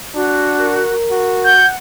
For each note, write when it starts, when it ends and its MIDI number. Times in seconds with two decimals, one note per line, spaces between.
0.15 0.84 62
0.15 0.93 66
0.61 1.54 70
1.11 1.63 66
1.45 1.74 78
1.45 1.67 91